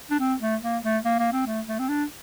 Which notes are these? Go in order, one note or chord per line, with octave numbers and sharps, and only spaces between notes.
D4
C4
A3
A#3
A3
A#3
A#3
C4
A3
A3
C4
D4